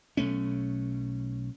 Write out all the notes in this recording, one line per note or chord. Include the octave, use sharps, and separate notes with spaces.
B1 A3 C#4